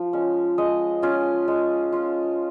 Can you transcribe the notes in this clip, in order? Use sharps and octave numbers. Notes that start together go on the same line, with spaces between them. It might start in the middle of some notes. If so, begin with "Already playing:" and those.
Already playing: F3
G#3 C#4
G#3 D#5
C#4 F4
G#3
C#4 F4